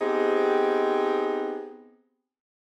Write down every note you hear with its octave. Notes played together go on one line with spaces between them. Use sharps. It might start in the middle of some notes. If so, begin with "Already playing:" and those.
B3 C4 D#4 G4 G#4